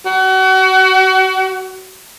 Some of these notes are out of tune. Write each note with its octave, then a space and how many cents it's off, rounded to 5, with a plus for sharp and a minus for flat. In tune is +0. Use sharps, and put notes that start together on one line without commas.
F#4 +35